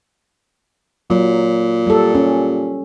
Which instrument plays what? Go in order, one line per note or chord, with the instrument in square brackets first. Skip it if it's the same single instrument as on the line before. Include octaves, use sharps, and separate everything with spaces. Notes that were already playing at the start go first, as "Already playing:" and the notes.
[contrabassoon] A#2 [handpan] F#3
[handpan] G3 A4
C#4